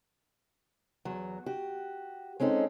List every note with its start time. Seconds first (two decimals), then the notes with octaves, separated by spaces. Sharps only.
1.05 E2 F#3
1.46 F#4 G4
2.40 G#3 C4 C#4 D#4 A4